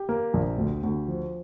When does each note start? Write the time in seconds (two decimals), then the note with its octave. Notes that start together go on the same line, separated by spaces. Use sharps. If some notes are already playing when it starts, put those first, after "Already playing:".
Already playing: G4
0.09 A#3
0.34 A#1
0.58 D2
0.83 D2
1.08 F3